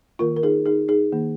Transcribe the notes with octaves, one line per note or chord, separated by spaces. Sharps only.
D#3 A#3 F4 A#4
A#4
D#4 G#4
D#4 G#4
D#4 G#4
D#3 A#3